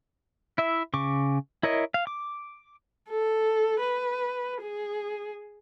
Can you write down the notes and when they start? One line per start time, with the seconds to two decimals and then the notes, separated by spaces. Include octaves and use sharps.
0.58 E4 E5
0.94 C#3 C#6 D6
1.63 E4 A#4 C#5 D#5
1.94 F5
2.07 D6
3.09 A4
3.80 B4
4.62 G#4